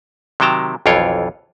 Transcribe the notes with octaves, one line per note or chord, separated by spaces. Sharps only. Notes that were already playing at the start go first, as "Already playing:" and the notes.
C3 D#3 F#3 G5 A5 A#5
B1 F2 E3 F4 C#5 G5